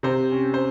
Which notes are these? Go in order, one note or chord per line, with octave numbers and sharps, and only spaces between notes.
C3 C5
C#4
C5